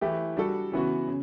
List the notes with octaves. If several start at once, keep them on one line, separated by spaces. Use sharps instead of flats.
E3 A3 E4 G4
G3 D4 F#4 A4
C#3 E3 B3 F#4
C#3